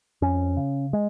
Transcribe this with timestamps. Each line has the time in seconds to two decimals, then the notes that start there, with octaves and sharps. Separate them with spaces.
0.22 F2 C#4
0.57 C#3
0.93 G#3